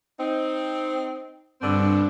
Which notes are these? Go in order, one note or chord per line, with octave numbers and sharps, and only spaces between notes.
C4 D#4
G2 B2 D3 C4 D4